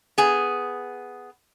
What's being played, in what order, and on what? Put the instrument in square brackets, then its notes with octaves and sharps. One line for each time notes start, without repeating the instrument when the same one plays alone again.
[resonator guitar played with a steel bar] B3 G#4